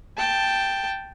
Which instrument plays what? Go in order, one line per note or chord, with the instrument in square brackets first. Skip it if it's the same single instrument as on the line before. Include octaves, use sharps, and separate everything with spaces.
[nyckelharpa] G5 A5